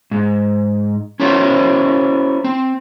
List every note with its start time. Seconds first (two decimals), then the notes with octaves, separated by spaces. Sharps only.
0.11 G#2
1.20 C#4 E4 F#4 A#4 C5 C#5
2.44 C4